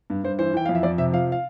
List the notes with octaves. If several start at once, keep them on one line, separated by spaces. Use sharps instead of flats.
G2
G2 C5
E3 C5
E3 G5
F2 F5
E5
F2 D5
C3 E5
F3 F5
F5